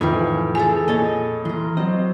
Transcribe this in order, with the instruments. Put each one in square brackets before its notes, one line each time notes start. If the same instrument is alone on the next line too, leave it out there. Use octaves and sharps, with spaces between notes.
[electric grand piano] F2 G5 [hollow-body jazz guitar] A2 C3 D#3 [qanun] E3 F5 G#5
[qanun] E3 G#4 A4 [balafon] G#5
[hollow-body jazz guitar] A#2 C#5 [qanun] D#5 A5
[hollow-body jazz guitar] E3 [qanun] A#4 C6
[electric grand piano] F#3 C4 [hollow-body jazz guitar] D#5